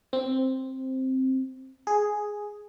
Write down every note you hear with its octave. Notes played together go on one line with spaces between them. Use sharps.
C4
G#4